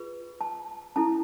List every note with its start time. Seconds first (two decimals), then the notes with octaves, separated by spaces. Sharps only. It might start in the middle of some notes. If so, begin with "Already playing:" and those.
Already playing: F4 G#4 B4
0.41 A5
0.96 C#4 E4 A4 A5